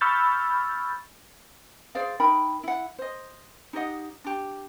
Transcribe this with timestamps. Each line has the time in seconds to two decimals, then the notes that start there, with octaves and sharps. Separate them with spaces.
0.01 B5 C#6 E6 F6 G6 A6
1.95 G#4 C5 D5 F5
2.20 D#4 A#4 G5 B5
2.63 E4 F#5
2.98 C5 D#5
3.73 D#4 G4 D#5 F#5
4.24 D4 G4